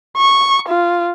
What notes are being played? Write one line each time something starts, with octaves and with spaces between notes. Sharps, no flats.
C#6
F4